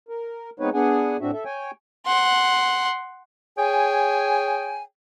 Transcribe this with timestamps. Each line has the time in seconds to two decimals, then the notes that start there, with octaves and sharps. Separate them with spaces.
0.09 A#4
0.60 G#3 B3 C4 D#4 B4 C#5
0.74 B3 D4 G#4 F#5 G#5
1.21 A2 C4 D4 F#4 E5
1.33 A4 E5
1.45 C#5 G5 G#5
2.06 F#5 C6
3.57 G#4 C#5 G5 G#5